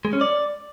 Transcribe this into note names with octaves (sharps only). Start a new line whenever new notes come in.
G#3
C#4
D5